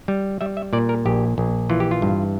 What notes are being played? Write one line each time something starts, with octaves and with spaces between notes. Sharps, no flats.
G3
G3 E5
E5
A#2 D5
A#4
A#1 G4
A#1
E3 F4
G4
F4
G2